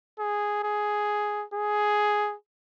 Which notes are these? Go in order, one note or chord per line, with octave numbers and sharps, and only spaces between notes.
G#4
G#4
G#4